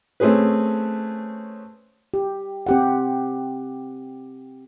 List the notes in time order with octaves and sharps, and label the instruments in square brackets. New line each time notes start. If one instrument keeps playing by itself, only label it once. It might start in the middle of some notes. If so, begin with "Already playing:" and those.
[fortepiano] A3 C4 C#4 G#4 B4
[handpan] G4
C4 G4 F#5